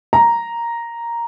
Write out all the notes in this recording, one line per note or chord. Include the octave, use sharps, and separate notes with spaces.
A#5